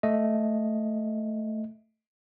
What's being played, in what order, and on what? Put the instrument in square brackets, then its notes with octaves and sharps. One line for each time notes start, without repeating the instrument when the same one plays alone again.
[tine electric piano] A3 D#5